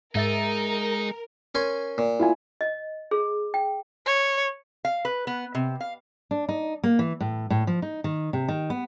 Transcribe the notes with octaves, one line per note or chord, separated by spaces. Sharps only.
G#2 G#3 D#4 A#4 E5 A6
C#4 A#4 G#5 C6
A#2
E4 F4 G#5
D#5
G#4
G5
C#5
F5
B4
B3
C3
F5
D4
D#4
A#3
E3
A2
A2
F3
D#4
D#3
C3
D#3
B3